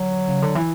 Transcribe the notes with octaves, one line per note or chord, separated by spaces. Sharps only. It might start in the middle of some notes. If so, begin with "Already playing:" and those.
Already playing: D3 F#3
C#3
D3
E3